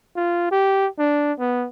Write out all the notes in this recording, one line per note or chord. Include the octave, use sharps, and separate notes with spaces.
F4
G4
D4
B3